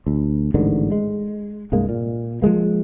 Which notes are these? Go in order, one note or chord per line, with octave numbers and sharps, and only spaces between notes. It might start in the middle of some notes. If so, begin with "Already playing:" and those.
D2
A1 G#2 D3 D#3
G#3
C2 G2 G#3 A#3
A#2
F3 F#3 G#3 A#3